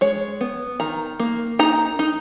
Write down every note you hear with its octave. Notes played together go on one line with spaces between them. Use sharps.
G#3 C#5
B3
D#3 A#5
A#3
D#4 A#5
D#4